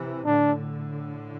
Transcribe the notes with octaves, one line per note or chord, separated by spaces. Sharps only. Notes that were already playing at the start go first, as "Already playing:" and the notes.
Already playing: C3 E3
A2 D3 D4